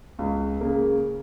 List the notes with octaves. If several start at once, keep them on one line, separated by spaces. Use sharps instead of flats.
C#2
C#3 A#3